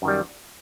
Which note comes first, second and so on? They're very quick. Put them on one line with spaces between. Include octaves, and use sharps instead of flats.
F#2 D#3 G3